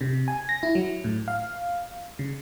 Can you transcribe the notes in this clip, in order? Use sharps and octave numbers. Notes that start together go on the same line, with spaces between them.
C3
G#5
A#6
E4
F#3
A2
F5
C#3